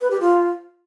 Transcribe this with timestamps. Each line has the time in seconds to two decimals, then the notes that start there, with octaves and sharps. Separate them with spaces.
0.01 B4
0.11 G4
0.21 F4